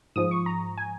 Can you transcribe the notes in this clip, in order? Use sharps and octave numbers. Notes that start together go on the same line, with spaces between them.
G#2 F3 G#3 D#6
C#6
A#5
G#5